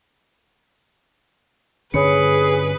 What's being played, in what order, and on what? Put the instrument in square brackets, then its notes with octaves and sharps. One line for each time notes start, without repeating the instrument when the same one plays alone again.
[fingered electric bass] G2 D3 C#4 [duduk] G#4 [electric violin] B4 [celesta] C#5 B5 C#7